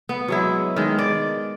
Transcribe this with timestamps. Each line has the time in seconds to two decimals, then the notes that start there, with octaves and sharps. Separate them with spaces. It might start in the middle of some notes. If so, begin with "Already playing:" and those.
0.09 B3
0.28 F#3 G#3 E4
0.76 D#3 G#3
0.98 D5